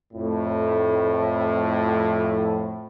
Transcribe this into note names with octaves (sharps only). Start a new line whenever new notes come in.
F2 A2